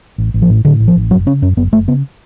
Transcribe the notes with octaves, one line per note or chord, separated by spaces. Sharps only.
A1
A1
F3
A2
A2 D3
A1
F3
A1
F#1 F#3
C#3 C#4
F#2 C#4
F#1 B3
F#1 A3
C#3 B3